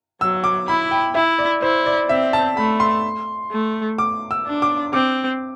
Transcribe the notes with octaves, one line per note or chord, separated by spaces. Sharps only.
F#3 E6
D6
E4 B5
G5
E4 E5
D5
E4 C5
D5
C4 E5
A5
A3 B5
C6
A3
D6
E6
D4
D6
C4 D6